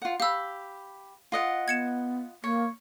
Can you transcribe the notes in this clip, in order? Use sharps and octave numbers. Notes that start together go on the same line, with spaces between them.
F4 F#5
G4 F5 B5 E6
F4 D#5 F#5
B3 G#6 C#7 E7
A#3 C#5